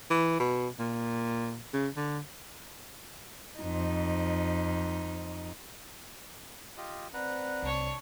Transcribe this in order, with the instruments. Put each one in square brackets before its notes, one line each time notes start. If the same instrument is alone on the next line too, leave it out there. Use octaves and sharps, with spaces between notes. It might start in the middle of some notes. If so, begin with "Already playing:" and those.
[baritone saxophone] E3
B2
A#2
C#3
D3
[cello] F2 D#4
[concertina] F4 G4 D#5
[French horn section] C4 D5 [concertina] B4 F#5 A#5
[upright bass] C2 [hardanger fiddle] D4 C#5